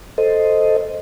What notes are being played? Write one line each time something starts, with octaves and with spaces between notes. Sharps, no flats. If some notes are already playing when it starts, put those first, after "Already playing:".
A4 C5 D#5